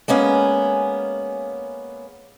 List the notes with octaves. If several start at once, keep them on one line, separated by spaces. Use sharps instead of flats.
G#3 A#3 B3 C#4